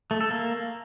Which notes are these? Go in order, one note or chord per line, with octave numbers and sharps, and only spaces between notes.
A3
A4
A#3